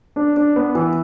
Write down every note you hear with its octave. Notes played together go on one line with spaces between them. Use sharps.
D4
D4
B3
E3